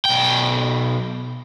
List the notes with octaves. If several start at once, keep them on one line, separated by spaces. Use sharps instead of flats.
B1 G5